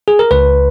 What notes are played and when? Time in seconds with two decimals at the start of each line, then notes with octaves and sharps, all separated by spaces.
0.08 G#4
0.19 A#4
0.31 C#2 B4